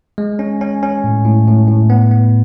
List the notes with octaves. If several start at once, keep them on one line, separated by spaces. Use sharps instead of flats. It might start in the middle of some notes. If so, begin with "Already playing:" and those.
G#3
C#4
C#4
C#4
A2
A2
A2
A2
B3
B3